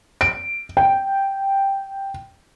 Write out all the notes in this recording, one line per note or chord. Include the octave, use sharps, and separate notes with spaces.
D7
G5